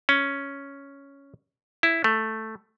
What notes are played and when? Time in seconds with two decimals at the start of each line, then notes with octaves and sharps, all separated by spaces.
0.09 C#4
1.83 E4
2.04 A3